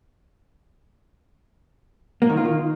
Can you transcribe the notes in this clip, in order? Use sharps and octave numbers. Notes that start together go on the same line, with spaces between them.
A#3
D#3
F4
D#3